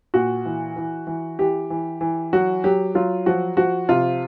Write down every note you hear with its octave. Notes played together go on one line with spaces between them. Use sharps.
A#2 F#4
E3
E3
E3
E3 G4
E3
E3
F#3 F#4
F#3 G4
F#3 F4
F3 F#4
F3 F#4
C3 F4